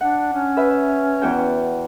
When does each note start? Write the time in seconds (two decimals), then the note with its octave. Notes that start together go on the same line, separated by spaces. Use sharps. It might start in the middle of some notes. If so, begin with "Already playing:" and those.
0.01 D4 F#5
0.33 C#4
0.57 B4 E5
1.22 E2 F#4 G5